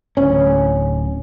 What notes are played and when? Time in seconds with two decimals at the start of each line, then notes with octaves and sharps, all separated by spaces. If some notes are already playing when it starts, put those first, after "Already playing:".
0.17 D1 C#4